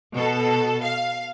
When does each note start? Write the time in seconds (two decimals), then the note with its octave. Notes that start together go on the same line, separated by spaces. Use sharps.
0.16 B2 A4
0.84 F5